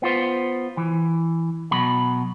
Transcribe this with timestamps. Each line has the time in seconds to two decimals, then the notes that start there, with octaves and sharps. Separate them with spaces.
0.02 B3 F4 C5
0.77 E3
1.71 B2 F#3 B5